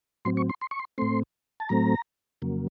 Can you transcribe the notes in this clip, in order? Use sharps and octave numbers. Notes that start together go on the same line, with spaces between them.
A2 F#3 C4 C6
C#6
C6
C6
C#6
C6
A2 A3 C4 C6
A5
A2 F#3 A3 C4 A#5
F2 C#3 F#3 A#3